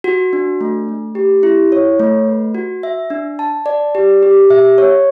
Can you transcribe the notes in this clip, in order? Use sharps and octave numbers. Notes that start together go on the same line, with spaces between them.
F#4
D4
A3
A3
G4
E4
C#5
A3
B4
F#4
E5
D4
A5
D5
G4
G4
E5
C#5